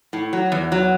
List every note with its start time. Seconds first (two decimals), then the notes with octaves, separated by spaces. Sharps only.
0.13 A2
0.33 F#3
0.52 E2
0.72 F#3